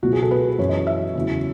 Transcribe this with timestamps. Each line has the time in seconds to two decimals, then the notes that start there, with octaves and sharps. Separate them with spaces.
0.02 C#2 B2 F#3 F#4
0.13 G#4
0.22 A4
0.31 B4
0.59 F#2 E3 C#5
0.69 D#5
0.87 E5
1.15 E2 C#3 F#3